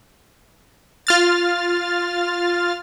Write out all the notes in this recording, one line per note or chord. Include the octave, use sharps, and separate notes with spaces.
F4 F6 A6